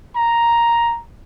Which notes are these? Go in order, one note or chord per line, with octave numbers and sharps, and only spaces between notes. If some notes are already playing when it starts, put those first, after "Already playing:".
A#5